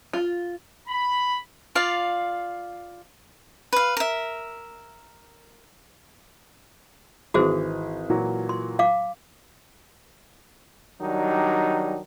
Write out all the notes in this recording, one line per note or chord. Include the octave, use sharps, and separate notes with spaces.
F4
B5
F4 D5 F5
B4 F5
A#4 E5
G#1 E3 F#4 G#4 C5 D#6
A#2 E3 F#3
C6
F5 D6
D#3 F#3 G3 D4 D#4